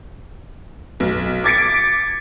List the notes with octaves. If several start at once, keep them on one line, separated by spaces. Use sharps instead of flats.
B1
D6 G#6 A6 B6 C#7 D7